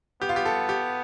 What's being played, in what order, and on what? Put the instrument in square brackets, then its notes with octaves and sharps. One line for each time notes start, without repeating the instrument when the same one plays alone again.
[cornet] B3 [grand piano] G4
[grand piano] F4
G4
A4
G4